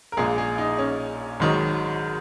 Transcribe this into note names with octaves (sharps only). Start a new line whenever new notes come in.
A#4
A#1 A#2 G#3 G#4
G#4
D#4
C#4
G#1 G#2 D#3 F#3